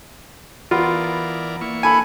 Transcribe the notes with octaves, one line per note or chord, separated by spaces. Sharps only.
E3 B3 F4 A#4 D5
A#3 E4 C#6
D4 A4 G#5 B5